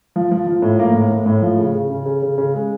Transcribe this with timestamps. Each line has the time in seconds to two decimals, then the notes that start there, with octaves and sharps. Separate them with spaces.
0.16 F3
0.31 F3
0.47 F3
0.62 A2
0.79 A#3
0.95 A2
1.11 A2
1.26 A2
1.42 F3
1.58 C#3
1.75 C#3
1.90 C#3
2.05 C#3
2.22 C#3
2.38 C#3
2.54 G#3